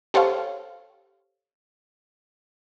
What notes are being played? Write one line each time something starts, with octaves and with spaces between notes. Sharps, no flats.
G4 A4 C5 C#5 F5